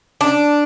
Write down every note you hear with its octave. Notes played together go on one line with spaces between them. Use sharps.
D4